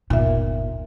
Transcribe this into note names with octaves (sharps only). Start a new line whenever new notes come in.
G1 D#2 A#2 E5